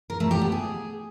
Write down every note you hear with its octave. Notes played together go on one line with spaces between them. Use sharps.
A#4
A3
G4
B3
G#4